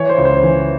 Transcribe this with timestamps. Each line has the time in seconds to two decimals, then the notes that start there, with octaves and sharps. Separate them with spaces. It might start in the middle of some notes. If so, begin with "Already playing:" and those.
Already playing: E3 C#5
0.09 C5
0.18 C#2
0.25 C5
0.43 E3